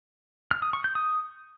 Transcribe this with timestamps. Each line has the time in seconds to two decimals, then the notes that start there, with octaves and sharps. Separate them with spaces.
0.51 F6
0.62 D#6
0.73 C#6
0.84 G6
0.95 D#6